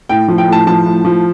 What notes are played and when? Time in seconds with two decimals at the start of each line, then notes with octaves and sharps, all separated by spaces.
0.09 A2 G5
0.28 F3
0.38 G5
0.48 A2 A5
0.67 F3 A5
0.86 A2
1.05 F3